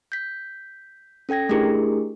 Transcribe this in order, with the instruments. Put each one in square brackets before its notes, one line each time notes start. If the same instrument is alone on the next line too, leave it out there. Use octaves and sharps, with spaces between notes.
[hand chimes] G6 B6
C#4 A4 G5 G#6 A#6
A3 D4 E4 G4 G#4 A#4